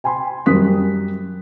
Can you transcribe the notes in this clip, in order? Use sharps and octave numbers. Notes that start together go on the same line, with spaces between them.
G5 G#5 B5 C6
F#2 G3 A#4 D#6 F#6 B6